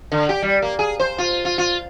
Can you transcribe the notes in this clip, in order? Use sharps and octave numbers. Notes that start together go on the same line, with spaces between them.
D3
G4
G3
A#3
G#4
C5
F4
F4
F4